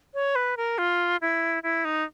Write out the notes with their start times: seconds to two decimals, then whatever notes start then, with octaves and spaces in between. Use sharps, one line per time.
0.14 C#5
0.36 B4
0.57 A#4
0.78 F4
1.21 E4
1.63 E4
1.85 D#4